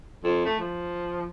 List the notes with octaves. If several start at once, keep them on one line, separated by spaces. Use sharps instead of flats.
F2
A3
F3